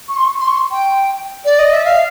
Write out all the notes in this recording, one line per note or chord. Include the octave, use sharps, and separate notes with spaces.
C#6
C6
C#6
C6
C#6
C6
G5
D5
D#5
E5
F5